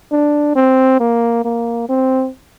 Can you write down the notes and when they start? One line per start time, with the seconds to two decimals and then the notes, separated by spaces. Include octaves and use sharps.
0.11 D4
0.55 C4
1.00 A#3
1.44 A#3
1.89 C4